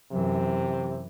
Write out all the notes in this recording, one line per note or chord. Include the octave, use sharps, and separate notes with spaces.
F#2 C3 E3